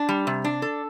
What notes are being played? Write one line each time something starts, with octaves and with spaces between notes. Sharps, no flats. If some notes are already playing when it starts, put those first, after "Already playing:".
Already playing: D4
G3
C3
D4
A4